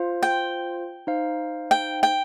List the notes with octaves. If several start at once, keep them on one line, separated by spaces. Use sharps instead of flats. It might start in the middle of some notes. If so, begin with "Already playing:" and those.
Already playing: F4 C5 F5
G5
D#4 C5 F5
G5
G5